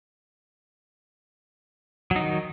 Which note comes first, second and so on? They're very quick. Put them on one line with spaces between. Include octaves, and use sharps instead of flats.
F#3 D#4 D#3